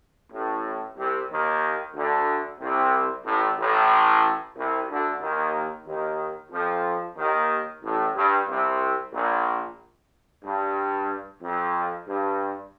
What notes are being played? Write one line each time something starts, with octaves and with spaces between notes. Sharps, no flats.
A1 A2
C2 C3
D#2 D#3
D2 D3
C2 C3
A1 A2
A1 A2
C2 C3
D2 D3
D#2 D#3
D#2 D#3
F2 F3
D#2 D#3
A1 A2
G2
C2 C3
A#1 A#2
G2
F2
G2